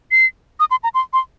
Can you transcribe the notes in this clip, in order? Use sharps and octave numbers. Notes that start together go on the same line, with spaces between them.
C7
D#6
C6
A#5
C6
C6